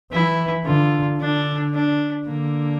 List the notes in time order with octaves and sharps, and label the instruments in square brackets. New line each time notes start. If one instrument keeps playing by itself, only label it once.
[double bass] E3 [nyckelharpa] E4
[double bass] D3 [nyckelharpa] F4
[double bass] D3 [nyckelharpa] D4
[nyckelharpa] D4
[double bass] D3 [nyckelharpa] A#3